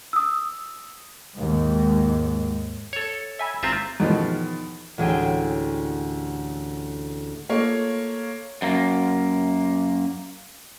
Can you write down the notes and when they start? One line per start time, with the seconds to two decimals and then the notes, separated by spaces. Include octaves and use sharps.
0.13 D#6 E6
1.35 D#2 G#2
2.93 A4 C#5
3.39 E5 G#5 B5
3.63 G#1 C4 F4 E5 A#5
4.00 E2 B2 D#3 F3
4.98 A1 D2 G#4 G5
7.49 A3 A#3 F4 C#5
8.62 F#2 A#3